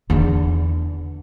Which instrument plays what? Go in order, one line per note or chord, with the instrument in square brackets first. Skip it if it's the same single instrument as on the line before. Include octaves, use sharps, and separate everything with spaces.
[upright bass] E2 D3